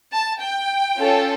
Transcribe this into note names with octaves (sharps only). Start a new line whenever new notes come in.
A5
G5
C#4 F4 A4